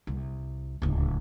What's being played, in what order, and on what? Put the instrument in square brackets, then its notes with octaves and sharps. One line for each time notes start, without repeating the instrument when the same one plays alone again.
[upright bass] C2
D1 C#2